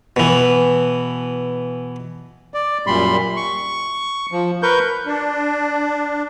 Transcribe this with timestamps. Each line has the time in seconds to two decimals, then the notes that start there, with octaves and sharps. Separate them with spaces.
0.16 B2 E3
2.54 D5
2.87 F#2 A#2 G3 B5 C6
3.37 C#6
4.32 F3
4.63 A#4 B4 C#6 G6
5.06 D4